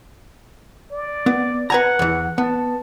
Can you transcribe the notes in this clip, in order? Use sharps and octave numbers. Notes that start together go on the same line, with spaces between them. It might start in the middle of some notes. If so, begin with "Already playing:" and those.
D5
B3
B4 F#5 G#5 A#5
E2 E3
B3 A5